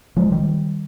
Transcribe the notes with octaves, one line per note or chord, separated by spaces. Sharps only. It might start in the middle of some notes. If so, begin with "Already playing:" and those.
F3 G#3
D#3 G3